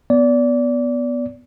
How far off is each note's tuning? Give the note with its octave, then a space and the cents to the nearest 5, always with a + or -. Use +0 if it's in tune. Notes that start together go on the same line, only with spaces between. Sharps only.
B3 +0 D5 -25